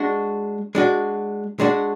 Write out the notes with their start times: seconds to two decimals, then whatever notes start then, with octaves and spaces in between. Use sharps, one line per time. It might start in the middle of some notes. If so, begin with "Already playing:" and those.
Already playing: G#3 D4 F#4
0.75 G#3 D4 F#4
1.60 G#3 D4 F#4